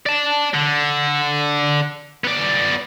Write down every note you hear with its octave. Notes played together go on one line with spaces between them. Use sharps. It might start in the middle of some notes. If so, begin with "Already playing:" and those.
D5 A5
D3
B3 D5